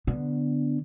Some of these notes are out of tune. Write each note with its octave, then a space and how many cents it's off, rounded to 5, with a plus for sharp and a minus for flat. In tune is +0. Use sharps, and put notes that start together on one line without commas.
D3 +0 B3 +0